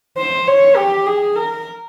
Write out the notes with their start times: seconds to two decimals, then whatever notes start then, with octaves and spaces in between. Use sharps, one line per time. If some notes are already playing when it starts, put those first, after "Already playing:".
0.18 C5
0.47 C#5
0.77 G4
1.07 G#4
1.36 A#4